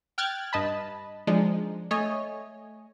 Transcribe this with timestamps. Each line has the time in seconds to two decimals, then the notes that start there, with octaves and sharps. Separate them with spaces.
0.18 G5 F6 F#6 G#6 A6
0.53 G2 D#5 A5 B5
1.27 F3 G#3 D4 D#4
1.91 A3 C#5 D#5 G#5